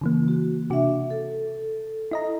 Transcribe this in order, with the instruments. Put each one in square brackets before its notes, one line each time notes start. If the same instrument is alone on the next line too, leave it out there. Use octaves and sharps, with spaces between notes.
[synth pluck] C#3 E3 A#3
[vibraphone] F#4
[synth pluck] C3 F#4 [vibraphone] D4 E5
[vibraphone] A4
[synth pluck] E4 D#5 A#5